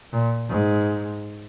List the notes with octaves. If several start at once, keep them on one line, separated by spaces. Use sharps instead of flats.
A#2
G#2